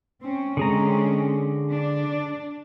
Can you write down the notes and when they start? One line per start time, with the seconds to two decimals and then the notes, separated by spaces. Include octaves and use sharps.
0.22 C4 C#4
0.57 D3 G#3 C4 C#4 G#4 A#5
1.73 D4